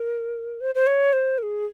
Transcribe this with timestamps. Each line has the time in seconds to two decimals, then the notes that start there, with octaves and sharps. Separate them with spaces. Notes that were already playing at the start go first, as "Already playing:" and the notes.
Already playing: A#4
0.61 C5
0.75 C5
0.87 C#5
1.13 C5
1.38 A#4
1.43 G#4